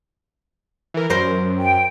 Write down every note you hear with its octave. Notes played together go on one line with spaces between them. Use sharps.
E3 A#4
F#2 A#4 C5
G5